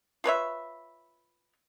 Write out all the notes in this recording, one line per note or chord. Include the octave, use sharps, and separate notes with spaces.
F4 B4 C#5 E5